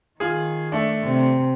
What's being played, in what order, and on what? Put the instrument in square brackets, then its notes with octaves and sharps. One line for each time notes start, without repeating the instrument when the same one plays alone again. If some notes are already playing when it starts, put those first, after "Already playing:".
[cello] D#3 [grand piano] F4 G#4
[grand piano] A3 D4
[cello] C3